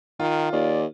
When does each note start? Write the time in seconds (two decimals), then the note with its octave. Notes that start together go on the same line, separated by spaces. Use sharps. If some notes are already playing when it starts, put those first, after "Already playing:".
0.20 D#3 F4
0.52 D#2 D5